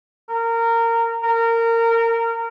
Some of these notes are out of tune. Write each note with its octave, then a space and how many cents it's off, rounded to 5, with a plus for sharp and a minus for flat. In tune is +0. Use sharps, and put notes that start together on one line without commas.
A#4 -20
A#4 -20